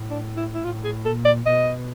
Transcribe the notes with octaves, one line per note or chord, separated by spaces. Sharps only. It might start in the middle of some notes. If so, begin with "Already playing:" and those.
Already playing: A2
D4
E4
E4
A2 F4
G#4
A#2 A4
D5
B2 D#5